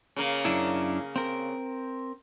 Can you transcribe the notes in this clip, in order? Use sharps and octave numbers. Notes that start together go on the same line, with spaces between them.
C#3 A#3
F#2 D4 E4
C4 A#4